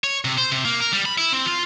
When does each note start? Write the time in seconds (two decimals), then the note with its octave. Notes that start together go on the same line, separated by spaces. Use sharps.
0.04 C#5
0.25 C3
0.38 C5
0.52 C3
0.65 A#3
0.80 A#4
0.93 G3
1.05 B5
1.18 E4
1.33 C4
1.46 F4